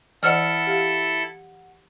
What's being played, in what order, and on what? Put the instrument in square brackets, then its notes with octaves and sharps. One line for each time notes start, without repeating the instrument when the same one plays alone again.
[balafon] E3 C5 D#5 [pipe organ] E4 A4 [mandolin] F#5 E6 F6
[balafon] G4 F5